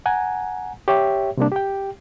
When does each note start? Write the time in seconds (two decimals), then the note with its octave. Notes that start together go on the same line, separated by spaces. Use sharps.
0.06 F#5 G#5 A#5
0.88 G4 C#5 E5 G5
1.37 C3 G3 A#3 D4
1.52 G4 G5